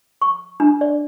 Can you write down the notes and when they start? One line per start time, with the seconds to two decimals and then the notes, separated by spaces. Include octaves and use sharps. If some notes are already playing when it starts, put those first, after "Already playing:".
0.22 C#6
0.60 D4
0.81 D5